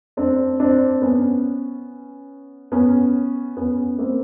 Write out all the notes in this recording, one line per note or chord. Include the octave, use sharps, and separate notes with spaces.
C4 D4
C4 D4
B3 C#4
B3 C#4
B3 C#4
A#3 C4